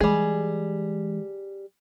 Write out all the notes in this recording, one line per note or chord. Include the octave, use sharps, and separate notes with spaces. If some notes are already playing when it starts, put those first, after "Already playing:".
E3 G3 G#3 G#4